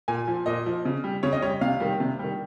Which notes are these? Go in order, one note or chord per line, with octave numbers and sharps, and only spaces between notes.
A#2 G#5
F3
A#2 D#5
F3
C#3
G3
C#3 C#5
D#5
G3 C#5
C3 F5
D#3 G3
C3
D#3 G3